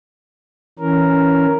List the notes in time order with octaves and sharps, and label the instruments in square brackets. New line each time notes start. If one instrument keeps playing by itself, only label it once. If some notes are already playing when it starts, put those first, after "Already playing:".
[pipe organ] E3 C#4 A#4